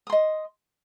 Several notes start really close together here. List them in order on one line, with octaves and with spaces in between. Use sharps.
D#6 C6 D#5